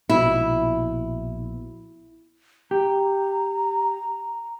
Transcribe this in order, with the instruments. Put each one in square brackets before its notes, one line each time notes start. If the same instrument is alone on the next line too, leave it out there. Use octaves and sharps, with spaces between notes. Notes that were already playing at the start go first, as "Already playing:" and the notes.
[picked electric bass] A#1 B2 [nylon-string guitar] E4
[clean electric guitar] G4 [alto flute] A#5